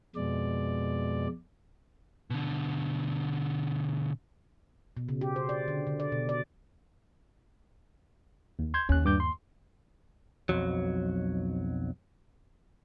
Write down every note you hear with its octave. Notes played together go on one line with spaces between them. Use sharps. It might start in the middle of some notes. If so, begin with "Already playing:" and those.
F2 B2 G#3 D5
B2 D3
B2
C#3
G4
C5
D5
D3
D3
D5
B2
D5
D#2
C6 G6 G#6
D#2 C#4 F#6
G2 D6 G6
C6
B1 F2 F#3